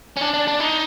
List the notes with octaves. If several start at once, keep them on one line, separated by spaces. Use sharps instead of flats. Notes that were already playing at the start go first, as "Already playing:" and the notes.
C#4
D4
D4
D4
D#4